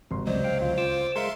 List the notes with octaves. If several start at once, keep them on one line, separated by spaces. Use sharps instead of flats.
G#1 C3 C6
C#2 F#3 C5 D5 D#5
F5 G5
D2 F4
F4 D6 E6
G#3 A#4 E5 F5 C6 C#7